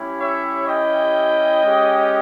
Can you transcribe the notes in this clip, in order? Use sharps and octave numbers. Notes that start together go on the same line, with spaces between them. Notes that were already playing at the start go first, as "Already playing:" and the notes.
Already playing: G3 C#4 E4 G4
C#5 E5
D#5 G5
G#3 C#4 G4